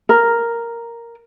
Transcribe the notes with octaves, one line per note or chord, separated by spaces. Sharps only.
A#4